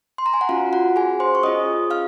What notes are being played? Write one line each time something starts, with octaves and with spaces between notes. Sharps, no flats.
C6
A#5
G#5
F#5
C#4 F4 F#4 F5
F#4 F#5
G#4 G#5
C5 C6
C#6
C#4 F4 G#4 D#5 D#6
F5 F6